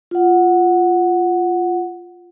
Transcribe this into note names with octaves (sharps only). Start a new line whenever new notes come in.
F4 F#5